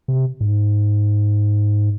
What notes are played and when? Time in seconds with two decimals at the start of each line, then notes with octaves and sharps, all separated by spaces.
0.08 C3
0.41 G#2